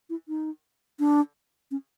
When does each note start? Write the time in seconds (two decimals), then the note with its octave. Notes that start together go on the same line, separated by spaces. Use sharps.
0.10 E4
0.28 D#4
0.99 D4
1.71 C#4